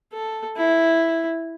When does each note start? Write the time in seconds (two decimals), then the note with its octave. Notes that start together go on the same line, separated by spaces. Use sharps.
0.13 A4
0.57 E4